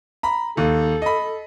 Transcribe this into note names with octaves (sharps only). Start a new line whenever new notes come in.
A#5 B5
D#2 A4
D#5 B5